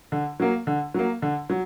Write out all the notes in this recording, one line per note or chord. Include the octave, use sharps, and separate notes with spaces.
D3
F#3 A#3
D3
F#3 A#3
D3
F#3